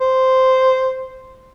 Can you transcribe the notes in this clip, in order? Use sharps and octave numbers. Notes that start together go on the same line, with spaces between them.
C5